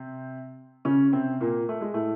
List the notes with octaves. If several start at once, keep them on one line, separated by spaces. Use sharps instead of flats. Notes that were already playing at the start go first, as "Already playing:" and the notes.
Already playing: C3 C4
C#3 C#4
C3 C4
A#2 A#3
A3
G#3
A2 A3